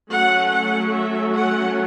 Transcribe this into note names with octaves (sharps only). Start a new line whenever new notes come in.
F#3 A3 C#4 F#5
F#5
E5
F#5